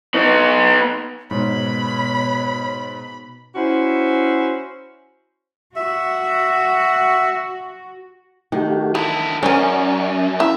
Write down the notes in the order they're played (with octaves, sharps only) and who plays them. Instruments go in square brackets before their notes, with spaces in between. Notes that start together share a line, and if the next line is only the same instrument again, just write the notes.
[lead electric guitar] B3 D#4
[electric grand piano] G#2 [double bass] B2 [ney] C#5 [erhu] B5
[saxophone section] C#4 E4 F#4 C5
[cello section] F#4 [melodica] E5
[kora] D#3 [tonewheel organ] A3 F#4 G4
[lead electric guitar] D3 E4 [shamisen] E3 [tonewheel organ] D#6
[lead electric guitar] F#2 [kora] C#4 A#4 [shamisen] C5 G#5 [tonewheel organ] D5 C#6
[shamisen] E4 [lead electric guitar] E5